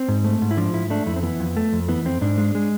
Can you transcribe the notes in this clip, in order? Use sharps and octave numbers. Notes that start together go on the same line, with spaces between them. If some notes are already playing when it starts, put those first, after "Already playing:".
Already playing: C4
G#2
A3
G#2
E4
F3 D4
G#2 E4
A3 D4
F2 E4
C4
E3 B3
F2
A3
F2
E3 B3
F2 C4
G#2 D4
G#3
G#3